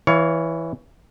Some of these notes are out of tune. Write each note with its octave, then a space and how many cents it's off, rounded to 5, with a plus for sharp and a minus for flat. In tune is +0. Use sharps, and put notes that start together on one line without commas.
E3 +0 C#5 +25 F5 +0